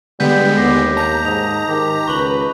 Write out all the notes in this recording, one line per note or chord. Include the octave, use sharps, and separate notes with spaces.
D3 G3 G#3 B3 G6 B6
D#2 D6 A#6 C7
A5 A#5 G6
G#2 D#5 F7
D#3 G4
C#2 B4 C#6 F7 F#7